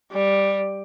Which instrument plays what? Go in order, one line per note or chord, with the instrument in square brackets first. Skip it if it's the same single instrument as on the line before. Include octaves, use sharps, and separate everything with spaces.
[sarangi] G3